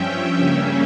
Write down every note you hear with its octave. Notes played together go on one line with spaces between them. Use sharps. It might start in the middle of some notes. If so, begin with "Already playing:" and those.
Already playing: G2 F3 C#4 E5 G5
C#3 G3 A#3 C#4